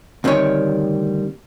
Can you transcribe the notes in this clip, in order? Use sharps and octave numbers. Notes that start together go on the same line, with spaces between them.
D2 C3 D#3 G3 C#5 G#5